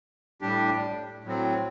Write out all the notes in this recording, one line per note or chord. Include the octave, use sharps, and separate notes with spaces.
A2 G3 D4 G4
A2 F#3 C4